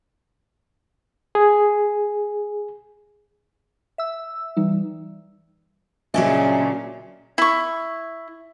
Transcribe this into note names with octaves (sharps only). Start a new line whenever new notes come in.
G#4
E5 E6
E3 G3 D#4
A#2 C#3 F#3 C#4 D4 D#5 E5 G#5
E4 C#6